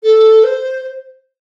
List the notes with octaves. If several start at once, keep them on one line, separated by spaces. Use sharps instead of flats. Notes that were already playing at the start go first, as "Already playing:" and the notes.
A4
C5